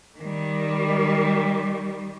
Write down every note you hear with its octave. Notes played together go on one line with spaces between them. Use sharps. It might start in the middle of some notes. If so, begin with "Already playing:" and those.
D#3 G3